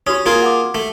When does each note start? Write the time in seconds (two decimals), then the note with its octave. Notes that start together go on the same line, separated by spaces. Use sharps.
0.07 C#4 F#4 G4 D#6
0.26 A#3 F4 G#4
0.42 F#5 G#5 D6
0.75 A3